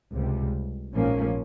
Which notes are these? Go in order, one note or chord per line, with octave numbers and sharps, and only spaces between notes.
C#2 C3 G3
A#1 G#2 F3 A#3 C#4